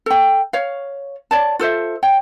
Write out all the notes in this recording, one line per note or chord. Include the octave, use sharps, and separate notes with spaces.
A4 G5
C#5 F5
C#5 D5 A5
F4 A4 C5 E5
C#5 G5